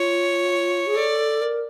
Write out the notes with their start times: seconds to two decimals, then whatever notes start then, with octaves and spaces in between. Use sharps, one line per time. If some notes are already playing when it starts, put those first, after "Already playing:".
Already playing: F4 C#5
0.87 G#4
0.96 A4 D5
1.41 A#4